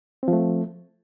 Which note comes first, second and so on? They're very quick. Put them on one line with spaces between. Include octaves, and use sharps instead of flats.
C4 F3 A3